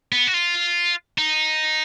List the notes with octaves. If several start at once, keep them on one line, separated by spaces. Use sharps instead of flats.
B3
F#4
F4
D#4